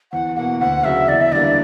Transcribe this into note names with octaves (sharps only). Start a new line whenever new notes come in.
E2 F#5
B2 A#3 F#5
D2 F#5
C#3 F#3 E5
E2 D5
E5
D3 G3 A#3 D5